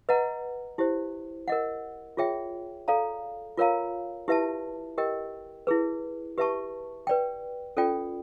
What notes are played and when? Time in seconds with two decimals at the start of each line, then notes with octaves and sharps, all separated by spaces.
0.09 B4 D#5 F#5 A#5
0.78 E4 G4 C5
1.48 A#4 D#5 F#5
2.17 F4 G#4 C#5 E5 G5
2.88 A4 D5 F5 A#5
3.57 F4 A#4 C#5 F5 A#5
4.28 E4 G4 B4 E5 A5
4.98 G4 A#4 D#5 G5
5.67 E4 G#4 B4
6.38 G4 B4 E5 A5 C#6
7.07 B4 D5 G5
7.77 C#4 F4 A4 D5 G5